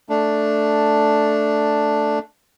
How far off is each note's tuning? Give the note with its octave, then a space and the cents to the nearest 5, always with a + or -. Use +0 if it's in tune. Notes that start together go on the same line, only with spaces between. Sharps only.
A3 +0 D4 +0